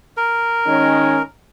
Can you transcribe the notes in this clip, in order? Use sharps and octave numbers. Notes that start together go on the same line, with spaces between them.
A#4
D#3 G#3 C#4